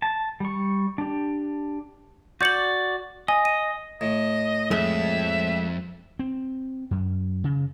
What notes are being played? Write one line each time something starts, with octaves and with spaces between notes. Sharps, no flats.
A5
G3 C#6
D4 G4
F#4 D5 G6 C#7 F#7
D#5 G#5
D#7
A2 D#5
F2 G#3 A3 E5
C4
F#2
C#3